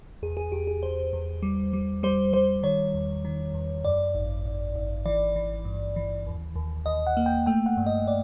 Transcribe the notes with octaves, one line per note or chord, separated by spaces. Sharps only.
E2 G#4
G#4
E2 G4
G#4
E2 C5
E2
G3
G3
G3 C5
G3 C5
D#3 C#5
E2
D#3
E2
F#2 D5
G#1
G#1
G#1
E3 D5
E3
G2
E3
D#2
D#2
D#2 D#5
F#5
A#3
G5
A3 G5
F#5
G2
D#5
D5